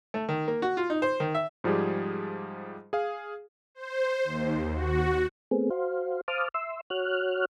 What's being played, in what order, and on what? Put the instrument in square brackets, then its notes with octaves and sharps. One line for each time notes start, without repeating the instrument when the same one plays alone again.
[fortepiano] A3
D#3
A#3
F#4
F4
D#4
C5
D#3
E5
[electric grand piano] G#2 F3 G3 G4 G#4
G#4 F5
[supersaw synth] C5
D#2
F#4
[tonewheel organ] A3 B3 C4 G#4
F#4 C5 F5
C5 F5 A5 D6 D#6 F6
E5 C6 E6
F#4 C#5 F6 F#6